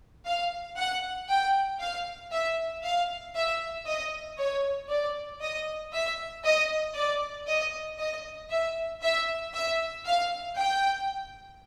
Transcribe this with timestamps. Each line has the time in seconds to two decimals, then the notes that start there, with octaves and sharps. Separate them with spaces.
0.26 F5
0.78 F#5
1.29 G5
1.81 F5
2.32 E5
2.83 F5
3.35 E5
3.86 D#5
4.38 C#5
4.90 D5
5.42 D#5
5.93 E5
6.44 D#5
6.95 D5
7.47 D#5
7.99 D#5
8.50 E5
9.02 E5
9.53 E5
10.05 F5
10.57 G5